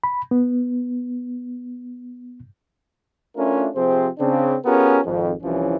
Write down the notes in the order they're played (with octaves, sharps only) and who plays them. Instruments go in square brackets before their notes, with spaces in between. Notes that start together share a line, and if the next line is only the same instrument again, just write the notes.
[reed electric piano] B5
B3
[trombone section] A3 C#4 D4 E4 F4 A#4
C3 F3 C4 G4 G#4 C5
C#3 C4 D4
B3 C#4 F4 G4 G#4 A#4
G#1 F2
C2 E3 F3 C#4